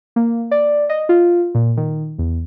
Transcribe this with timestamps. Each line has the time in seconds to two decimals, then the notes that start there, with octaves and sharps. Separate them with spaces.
0.16 A#3
0.51 D5
0.89 D#5
1.09 F4
1.55 A#2
1.77 D#3
2.19 E2